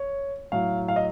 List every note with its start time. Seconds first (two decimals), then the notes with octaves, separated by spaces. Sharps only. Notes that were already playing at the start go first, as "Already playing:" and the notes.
Already playing: C#5
0.52 A2 F#3 F5
0.88 F5
0.96 D#5